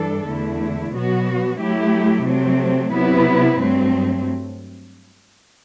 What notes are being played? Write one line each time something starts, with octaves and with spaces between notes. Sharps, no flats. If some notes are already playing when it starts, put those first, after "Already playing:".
Already playing: G2 E3 G3 D4 A4
E2 D3 A3 E4
B2 F#3 B3 F#4
F#3 A3 E4 G4
C3 F#3 A3 C4
C3 F#3 B3 E4 B4
G2 F#3 A3 C4